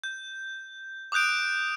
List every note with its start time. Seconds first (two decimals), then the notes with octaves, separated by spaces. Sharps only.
0.04 G6
1.12 D6 D#6 F#6 G6 D7